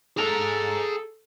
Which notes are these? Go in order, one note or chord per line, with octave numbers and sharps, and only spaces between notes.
G#4 A4 A#5